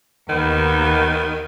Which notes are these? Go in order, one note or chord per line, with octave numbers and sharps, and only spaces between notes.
D#2 D#3 B3